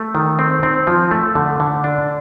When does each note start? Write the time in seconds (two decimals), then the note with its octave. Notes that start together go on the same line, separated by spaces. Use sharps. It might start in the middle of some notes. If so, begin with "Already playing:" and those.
Already playing: A3
0.15 D#3
0.39 C4
0.63 C4
0.87 F3
1.11 A3
1.35 D3
1.60 D3
1.84 D4